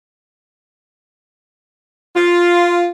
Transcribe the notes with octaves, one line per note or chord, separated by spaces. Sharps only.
F4